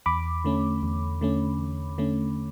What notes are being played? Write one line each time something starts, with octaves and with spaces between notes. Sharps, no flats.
E2 B5 D6
D3 A3 C#4
E2
D3 A3 C#4
E2
D3 A3 C#4